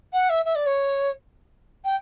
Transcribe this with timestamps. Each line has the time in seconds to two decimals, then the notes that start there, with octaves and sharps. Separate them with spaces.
0.13 F#5
0.30 E5
0.45 E5
0.55 D5
0.66 C#5
1.85 G5